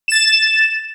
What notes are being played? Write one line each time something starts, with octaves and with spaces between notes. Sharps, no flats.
A6 E7